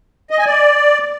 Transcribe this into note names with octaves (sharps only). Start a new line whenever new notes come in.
D#5
G#5
D5